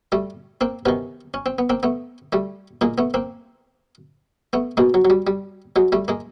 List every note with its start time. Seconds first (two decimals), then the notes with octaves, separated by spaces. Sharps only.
0.12 G3 A3
0.61 A#3 C4
0.86 C3 D#3 B3 C#4
1.34 C#4
1.46 C4
1.58 B3
1.70 A#3 C4
1.83 A3 B3
2.32 G3 A3
2.81 A#2 G#3 A#3
2.98 A3 B3
3.14 A#3 C4
4.53 A3 B3
4.77 B2 G#3 A#3
4.94 F#3
5.05 F#3
5.10 G3
5.27 G3
5.76 F#3 G#3
5.92 G3 A3
6.08 G#3 A#3